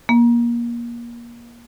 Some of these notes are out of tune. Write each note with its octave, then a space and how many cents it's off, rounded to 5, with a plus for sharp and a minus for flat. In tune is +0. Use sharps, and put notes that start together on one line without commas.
A#3 +25